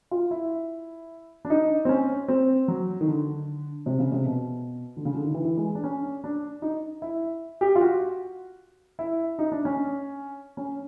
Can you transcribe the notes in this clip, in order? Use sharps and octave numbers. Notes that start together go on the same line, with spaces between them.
F4
E4
D4
D#4
C4
C#4
C4
F#3
D#3
D3
C3
C#3
C3
B2
D3
C#3
D3
D#3
E3
E3
G#3
D4
C#4
D4
D#4
E4
G4
F4
F#4
E4
D#4
D4
C#4
C#4